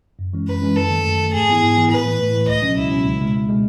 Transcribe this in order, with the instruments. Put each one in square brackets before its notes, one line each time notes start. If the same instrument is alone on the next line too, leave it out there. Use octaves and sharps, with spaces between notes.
[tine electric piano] F#2
E3 G#3 C#4
[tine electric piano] F#2 [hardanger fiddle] B4
[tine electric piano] E3 G#3 C#4
[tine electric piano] F#2 [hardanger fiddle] A4
[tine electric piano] D#3 A3
F#2
D#3 A3
[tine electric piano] G#2 [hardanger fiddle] G#4
[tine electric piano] E3 B3 E4
G#2
E3 B3 E4
[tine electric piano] A2 [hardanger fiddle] B4
[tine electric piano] E3 A3
A2
E3 A3
[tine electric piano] C#2 [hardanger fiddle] D#5
[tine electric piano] B2 F#3 C#4
[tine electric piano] C#2 [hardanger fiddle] E4
[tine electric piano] B2 F#3 C#4
C#2
B2 G#3
C#2
B2 G#3